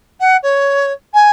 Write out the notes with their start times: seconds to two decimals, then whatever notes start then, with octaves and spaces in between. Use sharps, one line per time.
0.20 F#5
0.43 C#5
1.14 G#5